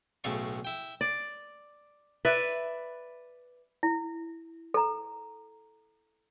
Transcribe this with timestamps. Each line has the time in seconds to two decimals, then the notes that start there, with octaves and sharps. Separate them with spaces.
0.24 B1 A2 C#3 D5 C#6
0.65 E4 G5
1.01 D5
2.25 B4 D5 E5
3.83 E4
4.74 A4 A#5